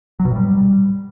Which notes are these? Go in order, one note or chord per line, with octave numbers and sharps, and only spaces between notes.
F#3
B2
A2
G3